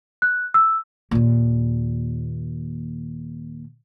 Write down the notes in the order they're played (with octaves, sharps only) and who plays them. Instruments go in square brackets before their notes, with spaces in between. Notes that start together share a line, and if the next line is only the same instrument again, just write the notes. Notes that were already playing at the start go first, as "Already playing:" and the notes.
[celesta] F#6
E6
[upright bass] D#2 A#2